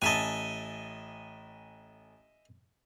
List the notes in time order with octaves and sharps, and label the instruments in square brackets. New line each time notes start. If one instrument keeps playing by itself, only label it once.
[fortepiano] A1 A5 [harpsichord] D#5 E5 G#5